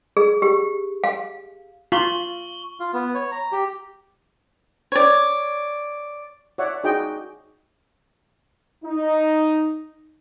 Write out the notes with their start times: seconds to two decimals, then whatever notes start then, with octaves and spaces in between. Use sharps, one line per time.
0.17 G#4
0.42 G4
1.04 F5
1.92 F4 C#6 F#7 G7
2.80 F4
2.94 B3
3.14 C#5
3.32 A#5
3.52 G4
4.92 C#5 D5
6.58 C#5 D5 E5 F#5
6.84 D#4 F#4 G#4 D#5 G5
8.85 D#4